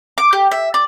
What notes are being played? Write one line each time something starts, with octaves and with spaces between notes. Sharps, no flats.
D6
G4
E5
D5